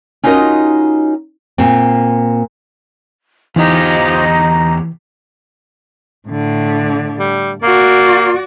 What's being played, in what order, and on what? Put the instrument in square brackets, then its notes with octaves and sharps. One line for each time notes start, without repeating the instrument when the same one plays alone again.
[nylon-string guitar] C#4 D#4 F4 F#4 A#4 D#5
A#2 C4
[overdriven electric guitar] E2 G4 [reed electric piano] E3 [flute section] D#4 [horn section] F4 C5
[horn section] A#5
[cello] A2 D3
[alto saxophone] G3
[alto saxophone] A#3 [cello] F#4 D5